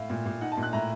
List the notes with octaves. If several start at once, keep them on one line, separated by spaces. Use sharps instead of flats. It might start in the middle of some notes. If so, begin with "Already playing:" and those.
Already playing: A2 F5
A#2
A#2
D#4 F#5
A5
A#2
F#6
A2 A#5